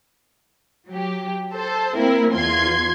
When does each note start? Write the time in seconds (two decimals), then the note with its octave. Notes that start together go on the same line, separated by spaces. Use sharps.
0.87 F#3 G4
1.53 A4 C5 A5
1.95 A#3 C4 E4 A#4
2.33 E2 F4 C6 G#6